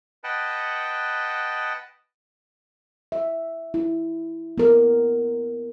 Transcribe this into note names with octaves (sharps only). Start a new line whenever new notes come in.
B4 D#5 F#5 G5 A5
E5
E4
B3 A#4